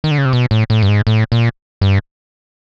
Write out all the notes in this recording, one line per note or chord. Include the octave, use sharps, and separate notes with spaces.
D#3
D3
C#3
C3
B2
A2
A2
G2
G#2
A2
A#2
G2